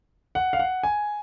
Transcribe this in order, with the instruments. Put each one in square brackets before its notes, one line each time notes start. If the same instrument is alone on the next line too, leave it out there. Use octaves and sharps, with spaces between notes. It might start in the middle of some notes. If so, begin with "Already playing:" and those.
[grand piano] F#5
F5
F#5
G#5